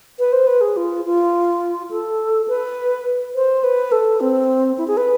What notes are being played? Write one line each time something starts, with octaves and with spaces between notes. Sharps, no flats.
B4
C5
B4
G#4
F4
F4
A4
B4
C5
B4
A4
C4
E4
G#4
B4